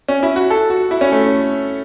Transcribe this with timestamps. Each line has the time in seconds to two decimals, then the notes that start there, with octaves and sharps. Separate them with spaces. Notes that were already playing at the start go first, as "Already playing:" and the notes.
0.08 C#4
0.23 E4
0.36 F#4
0.50 A4
0.70 F#4
0.91 E4
1.01 C#4
1.12 A3